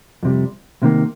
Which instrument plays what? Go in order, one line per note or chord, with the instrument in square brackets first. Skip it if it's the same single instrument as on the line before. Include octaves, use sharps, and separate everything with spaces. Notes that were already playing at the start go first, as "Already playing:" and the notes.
[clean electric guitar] F2 C3 G3
C2 C3 D#3 A#3